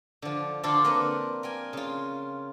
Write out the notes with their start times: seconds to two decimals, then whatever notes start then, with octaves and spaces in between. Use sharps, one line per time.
0.22 D3 F3
0.63 D3 D4 F4 A4 C5
0.84 A#3 C4 A#4 B4
1.43 A#4 G5 G#5
1.73 C#3 F4